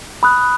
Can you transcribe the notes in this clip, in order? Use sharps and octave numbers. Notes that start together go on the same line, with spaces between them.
B5 D#6 F#6